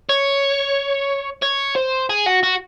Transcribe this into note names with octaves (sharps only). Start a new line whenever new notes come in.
C#5
C#5
C5
G#4
F#4
F#4